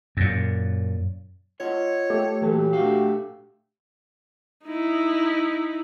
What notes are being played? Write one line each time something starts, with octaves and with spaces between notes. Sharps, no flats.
F#2 A#2
F4 C#5 D#5 F#5
A3 G4 A4
A#2 E3 F#3 G4 A4 B4
A3 D4 F#4 F5
D#4 E4